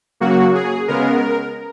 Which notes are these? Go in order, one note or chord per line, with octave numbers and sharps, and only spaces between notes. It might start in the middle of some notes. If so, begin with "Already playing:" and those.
C#3 F#3 A#3 F#4
G#4
C#3 G#3 B3 A#4